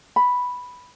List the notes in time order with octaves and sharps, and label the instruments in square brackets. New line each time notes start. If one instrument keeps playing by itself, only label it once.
[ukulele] B5